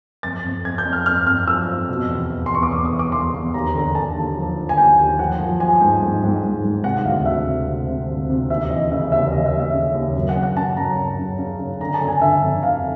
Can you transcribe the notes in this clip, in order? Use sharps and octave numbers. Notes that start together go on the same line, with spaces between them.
F2 A6
F2
F2 G#6
G6
F2
F6
F2 F6
F2 F6
F3 E6
F2
B2
E2
E2
C6
E2 C#6
D6
E2 D#6
D#6
E2
D6
E2 C6
E2
D#2 A#5
D3 A#5
D3 A5
D#2
F3
D3
G#5
D#2 G5
D#2
F3 F#5
F3
F3 G#5
G#2 G5
G#2
G#2
G#2
G#2
C3 F#5
D2 F5
D2 E5
C3
C3
C3
D2
C3
D#2 E5
E3 D#5
C#3 E5
D#2 E5
E5
D#2 D#5
E5
D#2
E5
C#3
D#2
F#2
F#5
C#3
F#5
C#3 A5
F#2 A#5
F#2
C#3
C#3
C#3
D3 A#5
A5
D3
G#5
D3 E5
F2
D3 F5